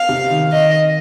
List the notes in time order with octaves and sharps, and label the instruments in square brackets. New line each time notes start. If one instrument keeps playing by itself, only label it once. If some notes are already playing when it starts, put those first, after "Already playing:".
Already playing: [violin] F5
[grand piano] C3
D#3
[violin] D#5